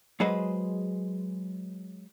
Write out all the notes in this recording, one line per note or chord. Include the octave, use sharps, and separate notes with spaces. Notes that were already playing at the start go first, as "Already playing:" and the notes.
F#3 G#3 G#4 B4 C5 D#5